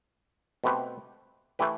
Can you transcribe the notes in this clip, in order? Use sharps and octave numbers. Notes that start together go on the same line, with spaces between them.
B2 A3 C4 G4 B4
E3 A3 E4 G4 B4